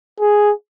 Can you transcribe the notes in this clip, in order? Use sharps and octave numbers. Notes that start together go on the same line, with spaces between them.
G#4